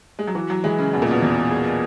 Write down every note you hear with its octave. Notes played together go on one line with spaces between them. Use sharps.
G#3
F#3
E3 F#4
F#3
E3 G#3
C#3
E2 B2
A#2
B2
E2
G#4